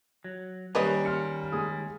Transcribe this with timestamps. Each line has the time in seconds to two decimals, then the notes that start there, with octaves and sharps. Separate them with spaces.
0.24 F#3
0.75 D#2 G3 A#3 C#4 B4 C#5 D#5
1.05 C6 F6 C#7
1.52 G#3 G#4 D#6